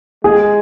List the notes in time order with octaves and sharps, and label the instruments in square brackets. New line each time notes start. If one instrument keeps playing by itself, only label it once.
[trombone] G#3 [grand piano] G#4